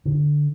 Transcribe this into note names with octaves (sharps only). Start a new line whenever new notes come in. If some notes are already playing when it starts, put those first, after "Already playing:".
D3